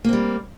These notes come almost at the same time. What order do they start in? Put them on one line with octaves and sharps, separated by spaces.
A#3 C4 G3